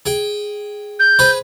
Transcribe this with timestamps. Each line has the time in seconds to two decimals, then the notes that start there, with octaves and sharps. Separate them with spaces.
0.06 G#4 G5
1.00 G6
1.19 G#4 B4 C5